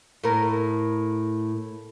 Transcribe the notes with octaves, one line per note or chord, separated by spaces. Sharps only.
A2 A#4